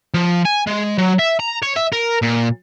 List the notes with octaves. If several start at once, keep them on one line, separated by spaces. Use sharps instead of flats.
F3
G#5
G#3
F#3
E5
A#5
C#5
E5
A#4
A#2